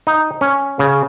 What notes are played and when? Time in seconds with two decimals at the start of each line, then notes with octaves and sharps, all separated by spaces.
0.07 D#4
0.41 C#4
0.79 C#3